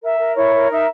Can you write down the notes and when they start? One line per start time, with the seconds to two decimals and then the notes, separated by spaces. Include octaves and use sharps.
0.01 A#4 E5
0.19 A#4
0.36 E4 C#5
0.54 A#4
0.70 D#4 E5